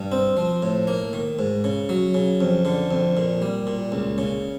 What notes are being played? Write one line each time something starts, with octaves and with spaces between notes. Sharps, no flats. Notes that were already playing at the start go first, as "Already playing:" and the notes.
Already playing: G2
C4
F3
A2
A#3
D#3
G#2
C#3
F#3
C#3
F2
D3
F2
A#2
G3
A#2
C#2
C#3